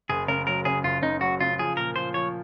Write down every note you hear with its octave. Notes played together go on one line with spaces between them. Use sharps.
F#1 G#4
C#3 A#4
F#3 A#4
C#3 G#4
F#1 F4
C#3 D#4
F#3 F#4
C#3 F4
F3 G#4
A#2 A#4
F3 C5
F3 C#5